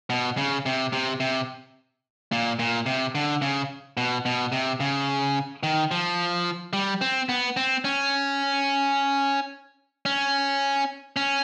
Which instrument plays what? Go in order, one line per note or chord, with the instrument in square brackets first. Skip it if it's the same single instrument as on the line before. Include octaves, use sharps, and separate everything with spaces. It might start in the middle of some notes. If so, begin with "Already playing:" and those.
[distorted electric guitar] B2
C#3
C3
C3
C3
A#2
A#2
C3
D3
C#3
B2
B2
C3
C#3
D#3
F3
G3
C4
B3
C4
C#4
C#4
C#4